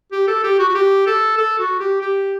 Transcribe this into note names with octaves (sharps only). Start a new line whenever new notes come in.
G4
A4
G4
F#4
F#4
G4
A4
A4
F#4
G4
G4